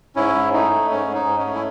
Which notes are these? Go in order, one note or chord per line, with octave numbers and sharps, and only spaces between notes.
G#2 C#4 E4
G#2
A3 D#4
A3
G#2 C#4
G#2
D#4
G#2
C#4
A3
E4